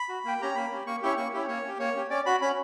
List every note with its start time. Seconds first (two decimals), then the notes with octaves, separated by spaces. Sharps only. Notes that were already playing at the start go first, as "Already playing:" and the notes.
Already playing: B5
0.09 F#4
0.25 A#3 G5
0.41 C#4 G4 A#5
0.55 A#3 B5
0.71 C#4 G4
0.86 A#3 C#6
1.02 C#4 E4 G4 C#6
1.17 A#3 C#6
1.33 C#4 E4 G4
1.48 A#3 C#5
1.64 C#4 G4
1.79 A#3 C#5
1.95 C#4 G4
2.10 C#4 D5
2.26 F#4 B5
2.41 C#4 B5